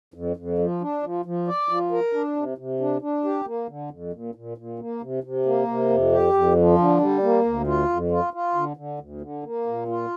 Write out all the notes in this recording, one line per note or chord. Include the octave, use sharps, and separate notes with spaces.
F2
F2
F3
D4
F3
F3
D5
F3
A#4
D4
C3
C3
D4
D4
G4
A#3
D3
F2
A#2
A#2
A#2
A#3
C3
C3
A#3
C3
F2
G4
F2
F3
D3
G3
A#3
D2
F4
F2
F4
F4
D3
D3
D2
D3
A#3
A#2
F4